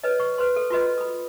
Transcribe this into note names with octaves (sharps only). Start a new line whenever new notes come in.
B4 C#5 D#5
C#6
B4 C5 C6
A4
F4 F#4 B4 D#5
B5 D#6